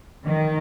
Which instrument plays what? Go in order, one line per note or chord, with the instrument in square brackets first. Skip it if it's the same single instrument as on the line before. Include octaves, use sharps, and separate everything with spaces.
[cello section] D#3